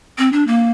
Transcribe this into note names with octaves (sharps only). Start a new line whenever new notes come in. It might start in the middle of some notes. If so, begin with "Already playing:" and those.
C4
D4
A#3